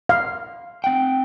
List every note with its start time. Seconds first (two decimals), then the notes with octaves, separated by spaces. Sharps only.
0.09 F5
0.84 C4 F#5 G5